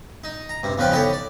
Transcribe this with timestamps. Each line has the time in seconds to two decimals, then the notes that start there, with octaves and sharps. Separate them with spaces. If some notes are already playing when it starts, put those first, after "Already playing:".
0.24 D#4
0.49 A#5
0.63 G2 C3
0.78 E2 C#3 F3 B4 D5 G5
0.91 D#4 E4 G4 A4 C#5
1.13 D5